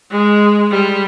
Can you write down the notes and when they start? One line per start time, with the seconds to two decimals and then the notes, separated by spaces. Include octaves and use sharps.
0.11 G#3
0.71 G3